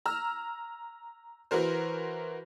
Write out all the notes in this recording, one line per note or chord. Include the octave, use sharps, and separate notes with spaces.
A#5 E6 F6
E3 F#4 A#4 C5